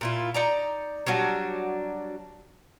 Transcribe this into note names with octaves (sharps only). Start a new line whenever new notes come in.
A#2 E4 F4
D#4 D5 A#5
F#3 G3 D4 F#4